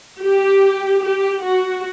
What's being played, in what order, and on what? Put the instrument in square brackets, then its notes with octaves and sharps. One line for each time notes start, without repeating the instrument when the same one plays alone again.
[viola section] G4
G4
F#4